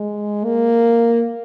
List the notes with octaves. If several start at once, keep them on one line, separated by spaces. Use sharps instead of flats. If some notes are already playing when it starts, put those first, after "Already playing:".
Already playing: G#3
A#3